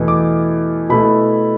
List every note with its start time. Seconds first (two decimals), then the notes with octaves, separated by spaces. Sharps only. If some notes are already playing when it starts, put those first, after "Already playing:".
Already playing: E2 B2 A3 E4
0.08 D6
0.89 B2 A3 E4 B5